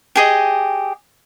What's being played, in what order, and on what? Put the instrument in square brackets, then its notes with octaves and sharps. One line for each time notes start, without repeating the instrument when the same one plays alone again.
[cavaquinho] G4 G#4 D#5